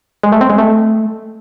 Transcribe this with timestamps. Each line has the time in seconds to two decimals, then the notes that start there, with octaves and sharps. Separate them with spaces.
0.23 G#3
0.32 A3
0.41 C4
0.50 G#3
0.58 A3